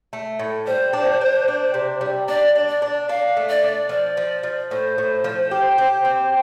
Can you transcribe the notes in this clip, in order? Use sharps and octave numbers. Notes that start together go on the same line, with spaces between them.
A3
A2
G3 C5
D4
D4
D4
C3
G3
D4 D5
D4
D5
D4
D4 F5
A3
D5
D4
F3 D5
F3
F3
A2 C5
A2
F3
G4
G4
C4